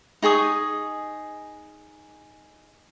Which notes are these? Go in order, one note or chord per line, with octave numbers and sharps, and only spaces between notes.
D#4 G#4 C#6 D#6